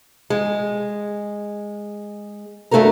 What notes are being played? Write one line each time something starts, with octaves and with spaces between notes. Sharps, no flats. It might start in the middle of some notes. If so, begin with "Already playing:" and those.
G#3
G2 A3 E4 F#4 A#4 A#5